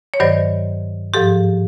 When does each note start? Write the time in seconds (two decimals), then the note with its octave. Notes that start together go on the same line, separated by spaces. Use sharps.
0.14 C#5
0.20 G2 D#3 F#3 C5 D5
1.14 G#2 F3 G4 A4